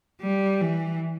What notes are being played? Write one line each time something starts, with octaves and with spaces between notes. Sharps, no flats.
G3
E3